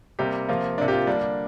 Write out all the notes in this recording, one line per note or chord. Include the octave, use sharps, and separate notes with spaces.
C3 G3 A#3 G4
C3 F3 A#3 F4
C3 A#3 D4
G4
F4
D3 G3 A#3 D4